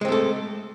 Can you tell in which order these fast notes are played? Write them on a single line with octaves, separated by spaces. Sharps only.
G#3 C4 A3 A4